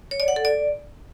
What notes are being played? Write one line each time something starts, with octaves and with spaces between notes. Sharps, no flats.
C#5
D5
F#5
A4
D5